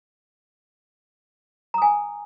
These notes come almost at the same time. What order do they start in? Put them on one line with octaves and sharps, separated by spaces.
A#5 D#6 G#5